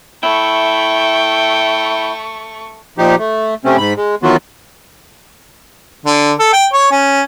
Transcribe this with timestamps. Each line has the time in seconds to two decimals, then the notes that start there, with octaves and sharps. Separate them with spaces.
0.23 A3 E4 G5 C#6
2.98 A#2 F3 D#4 G4
3.19 A3
3.65 C3 A3 C4 C#4
3.78 G#2 B5
3.97 G#3
4.23 D#3 E3 F#3 B3 F4 F#4
6.06 D3
6.39 A4
6.53 G5
6.73 C#5
6.91 C#4